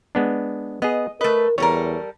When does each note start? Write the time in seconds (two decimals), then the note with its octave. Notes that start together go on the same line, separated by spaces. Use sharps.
0.15 G#3 B3 D4
0.82 B3 G#4 D#5
1.21 A3 A#4 B4 D#5
1.58 E2 G3 A4 A#4 C#5